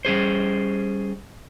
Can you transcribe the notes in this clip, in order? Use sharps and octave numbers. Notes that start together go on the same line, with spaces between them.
G3 C#4 G#4 C5